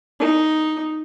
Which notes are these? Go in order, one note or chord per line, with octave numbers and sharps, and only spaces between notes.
D#4